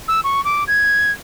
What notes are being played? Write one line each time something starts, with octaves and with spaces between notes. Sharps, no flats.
E6
C#6
D6
G#6